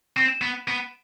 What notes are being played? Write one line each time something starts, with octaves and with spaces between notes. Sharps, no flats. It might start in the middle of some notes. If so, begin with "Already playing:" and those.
C4
B3
B3